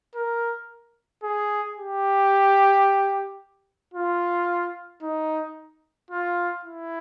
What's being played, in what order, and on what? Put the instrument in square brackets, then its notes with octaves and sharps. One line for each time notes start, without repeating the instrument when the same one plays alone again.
[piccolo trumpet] A#4
G#4
G4
F4
D#4
F4
E4